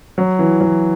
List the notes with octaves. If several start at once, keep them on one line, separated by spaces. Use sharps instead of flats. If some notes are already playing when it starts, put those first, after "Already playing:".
F#3
E3
F#3